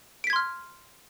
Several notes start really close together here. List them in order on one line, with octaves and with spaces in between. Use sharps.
D7 B6 G#6 C6 F6